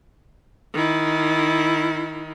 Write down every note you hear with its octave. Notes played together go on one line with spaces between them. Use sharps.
D#3 E4